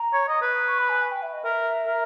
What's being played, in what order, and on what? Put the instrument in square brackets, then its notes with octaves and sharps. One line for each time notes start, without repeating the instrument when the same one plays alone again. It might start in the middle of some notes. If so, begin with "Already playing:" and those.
Already playing: [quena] A#5
[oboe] C#5
D#5
B4
[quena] C#6
B5
G#5
G#5
G5
E5
D#5
[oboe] A#4 [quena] E5
[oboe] A#4